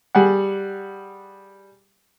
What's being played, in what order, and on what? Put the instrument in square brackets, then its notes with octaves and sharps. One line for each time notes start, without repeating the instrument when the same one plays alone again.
[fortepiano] G3 G#4 F#5